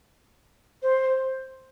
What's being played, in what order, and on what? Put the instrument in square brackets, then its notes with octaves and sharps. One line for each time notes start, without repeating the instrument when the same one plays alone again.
[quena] C5